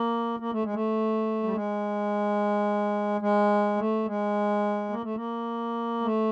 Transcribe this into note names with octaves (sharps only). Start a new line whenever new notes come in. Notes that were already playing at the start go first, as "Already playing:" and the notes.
Already playing: A#3
A#3
A3
G#3
A3
G3
G#3
G#3
A3
G#3
A#3
A3
A#3
A3